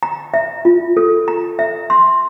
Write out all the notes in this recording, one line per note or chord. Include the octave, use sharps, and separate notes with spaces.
A#5
E5
F4
A4
A#5
E5
C6